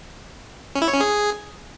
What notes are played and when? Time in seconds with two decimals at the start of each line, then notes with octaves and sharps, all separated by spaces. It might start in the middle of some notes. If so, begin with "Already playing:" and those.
0.75 C#4
0.82 E4
0.88 C#5
0.94 C#4
1.00 G#4